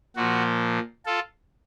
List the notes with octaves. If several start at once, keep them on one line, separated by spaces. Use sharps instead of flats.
A#2 F3 F#4
F4 A4